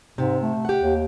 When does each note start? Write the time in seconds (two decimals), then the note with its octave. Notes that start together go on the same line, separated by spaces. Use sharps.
0.18 G#2 C3
0.42 A3
0.65 G4 F#5
0.82 D#2